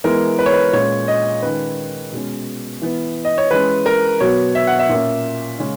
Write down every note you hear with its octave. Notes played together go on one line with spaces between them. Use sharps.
E3 G#3 B3 A#4
B4
C#5
B4
A#2 G#3 C#4 C#5
D#5
D#3 G#3 C#4 B4
B2 G#3 C#4
E3 B3
D#5
C#5
E3 G#3 C#4 B4
A#4
B2 F#3 B3 C#5
E5
F#5
E5
A#2 A#3 C#4
C#3 G#3 C#4